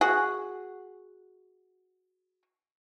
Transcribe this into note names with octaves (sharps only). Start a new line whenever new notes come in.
F#4 G#4 F#5